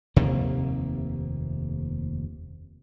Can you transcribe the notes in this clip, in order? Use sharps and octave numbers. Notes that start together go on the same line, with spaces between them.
F1 D#2 C3 A#3